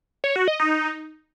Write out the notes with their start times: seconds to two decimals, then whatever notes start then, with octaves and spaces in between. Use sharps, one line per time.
0.24 C#5
0.36 F#4
0.48 D#5
0.60 D#4